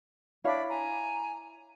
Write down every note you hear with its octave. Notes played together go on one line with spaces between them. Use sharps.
D4 E4 C#5 F5 B5
G#5 A#5